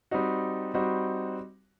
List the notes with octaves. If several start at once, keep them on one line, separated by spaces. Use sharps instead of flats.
G3 C4 D#4 F#4
G3 C4 D#4 F#4